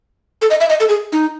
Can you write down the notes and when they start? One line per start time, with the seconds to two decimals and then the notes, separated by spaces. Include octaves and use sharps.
0.42 A4
0.50 D#5
0.60 E5
0.70 D#5
0.80 A4
0.89 G#4
1.12 D#4